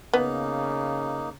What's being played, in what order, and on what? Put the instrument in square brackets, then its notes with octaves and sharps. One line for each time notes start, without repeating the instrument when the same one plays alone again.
[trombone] C#3 [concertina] A#3 D#4 [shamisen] B3